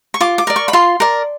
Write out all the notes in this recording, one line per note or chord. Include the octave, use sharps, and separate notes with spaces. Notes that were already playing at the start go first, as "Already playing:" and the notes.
C#6
F4 D6
D6
A#4 D5
C#6
B5
F4 C6
A#4 D5